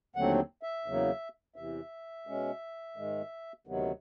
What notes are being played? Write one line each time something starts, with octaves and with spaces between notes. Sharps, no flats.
D#2 D3 F#3 A3 C4 F#5
E5
E2 C#3 F#3 A#3
E2 C3 E3 E5
B2 G#3 C#4
G#2 D#3 G#3
D2 C3 D#3 F#3 B3